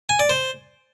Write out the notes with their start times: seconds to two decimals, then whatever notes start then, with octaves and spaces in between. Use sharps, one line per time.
0.09 G#5
0.19 D5
0.29 C5